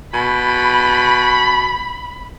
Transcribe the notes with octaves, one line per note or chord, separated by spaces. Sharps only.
B2 B5